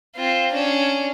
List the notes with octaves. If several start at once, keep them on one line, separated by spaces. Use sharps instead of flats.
C4 F4
C#4 D4